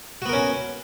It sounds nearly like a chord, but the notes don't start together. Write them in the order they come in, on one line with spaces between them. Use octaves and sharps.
F#4 B3 A#4 C#4